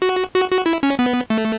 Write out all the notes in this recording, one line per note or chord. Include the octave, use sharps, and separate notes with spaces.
F#4
F#4
F#4
E4
C#4
B3
A3